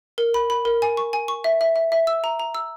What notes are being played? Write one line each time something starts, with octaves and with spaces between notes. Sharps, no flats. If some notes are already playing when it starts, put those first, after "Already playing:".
A#4
B5
B5
A#4
G#5
C#6
G#5
C#6
E5
E5
E5
E5
E6
A#5
A#5
E6